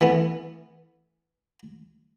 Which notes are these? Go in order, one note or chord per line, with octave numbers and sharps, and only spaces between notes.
E3 A3 B3